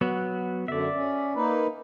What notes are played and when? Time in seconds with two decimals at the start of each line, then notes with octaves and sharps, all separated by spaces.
0.01 F#3 B3 F#4
0.68 F#2 D3 D5 E5
0.95 C#4
1.35 A#3 D#4 B4